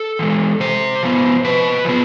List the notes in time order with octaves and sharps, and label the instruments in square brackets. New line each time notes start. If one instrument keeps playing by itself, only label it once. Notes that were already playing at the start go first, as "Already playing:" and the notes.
Already playing: [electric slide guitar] A4
E3 G#3
C3 C5
F3 B3
C3 B4
F3 B3